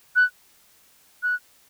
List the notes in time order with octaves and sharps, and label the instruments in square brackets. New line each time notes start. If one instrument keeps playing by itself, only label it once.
[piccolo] F#6
F#6